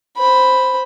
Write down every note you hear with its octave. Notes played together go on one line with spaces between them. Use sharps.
C5 B5